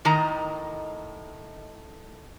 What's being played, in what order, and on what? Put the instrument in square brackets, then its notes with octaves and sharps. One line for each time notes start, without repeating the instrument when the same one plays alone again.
[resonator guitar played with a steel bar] A2 D#3 D#5 A#5